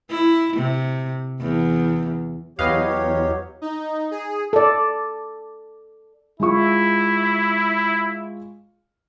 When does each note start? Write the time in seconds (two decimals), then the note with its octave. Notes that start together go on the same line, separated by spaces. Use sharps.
0.10 E4
0.57 C3
1.41 E2
2.59 E2 F#3 G4 B4 C#5 D#5 F5
3.62 D#4
4.11 G#4
4.53 A4 D5
6.40 G#3 E4 F4 C#6